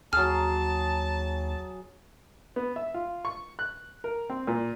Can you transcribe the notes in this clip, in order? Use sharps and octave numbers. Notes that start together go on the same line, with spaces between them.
D#2 F#3 G#4 A5 F6
B3
E5
F4
C#6
F#6
A#4
C4
A#2